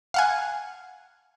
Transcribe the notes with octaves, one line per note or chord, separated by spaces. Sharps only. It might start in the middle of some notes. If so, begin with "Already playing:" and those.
F5 F#5 G#5